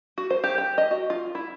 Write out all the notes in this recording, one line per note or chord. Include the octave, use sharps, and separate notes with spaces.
F#4
C5
G4
G4
D#5
F#4
F4
E4